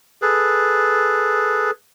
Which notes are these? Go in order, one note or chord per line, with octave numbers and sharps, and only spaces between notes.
G#4 A4 B4